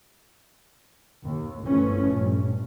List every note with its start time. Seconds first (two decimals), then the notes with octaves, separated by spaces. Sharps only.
1.24 D#2
1.64 G1 E3 F3 A3 C#4
2.11 A#1 G2